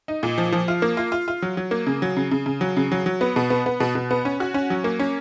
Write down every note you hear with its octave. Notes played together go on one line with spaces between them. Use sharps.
D#4
A#2
F3
F3
F4
A#3
F4
F4
F4
F#3
F#3
A#3
C#3
F#3
C#3
C#3
C#3
F#3
C#3
F#3
F#3
B3
B2
B3
B3
B2
B2
B3
C#4
F#4
C#4
F#3
A#3
C#4